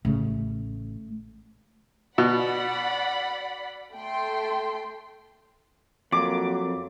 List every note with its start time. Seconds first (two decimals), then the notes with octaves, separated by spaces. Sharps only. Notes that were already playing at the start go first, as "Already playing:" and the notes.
0.05 A1 C#3 A3
2.18 B2 D5 F#5 B5
3.93 A3 G5 C6
6.12 F2 F#3 A#3 D6